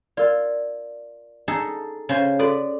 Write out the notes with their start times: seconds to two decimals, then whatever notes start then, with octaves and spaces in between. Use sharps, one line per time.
0.17 F4 A#4 D5
1.48 D#4 G#4 A4
2.09 C#3 C5 G#5
2.39 F#4 A4 B4 D5